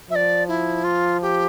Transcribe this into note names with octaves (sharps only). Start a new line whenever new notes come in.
F3 E5
D5
E4
F4
G4